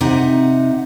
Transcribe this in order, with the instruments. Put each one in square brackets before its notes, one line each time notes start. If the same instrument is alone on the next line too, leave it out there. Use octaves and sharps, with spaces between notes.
[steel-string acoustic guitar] C3 D#4 F#5